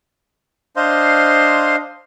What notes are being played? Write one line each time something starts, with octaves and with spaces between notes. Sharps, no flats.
D4 C5 D#5 F5 C6